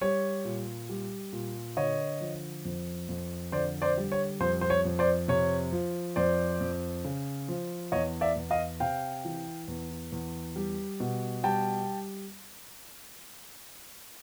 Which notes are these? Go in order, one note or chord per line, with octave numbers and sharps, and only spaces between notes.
G3 C#5
A#2
G3
A#2
D3 C#5 D#5
F3
F2
F2
D3 C5 D5
C5 D5
G3
C#5
F2 C5
C5
C#5
F2
C5 D5
C3 C#5
F3
F2 C5 D5
F2
C#3
F3
E2 C#5 D#5
D5 E5
E2
D#5 F5
C3 F5 G5
E3
E2
E2
G3
B2
G3 G5 A5